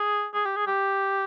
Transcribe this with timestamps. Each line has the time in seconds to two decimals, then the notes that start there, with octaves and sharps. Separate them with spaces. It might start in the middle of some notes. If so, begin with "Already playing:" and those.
Already playing: G#4
0.34 G#4
0.45 G4
0.56 G#4
0.67 G4